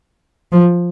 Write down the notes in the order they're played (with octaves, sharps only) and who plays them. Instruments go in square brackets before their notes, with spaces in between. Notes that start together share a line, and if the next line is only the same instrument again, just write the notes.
[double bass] F3